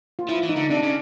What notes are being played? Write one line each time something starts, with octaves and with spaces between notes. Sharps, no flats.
F4
F3 E4
E3
D#4
D3
C3 D4
C#3